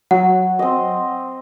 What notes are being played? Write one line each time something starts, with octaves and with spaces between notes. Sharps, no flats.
F#3 F#5
C4 D#5